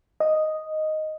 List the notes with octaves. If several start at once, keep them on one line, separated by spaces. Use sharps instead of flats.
D#5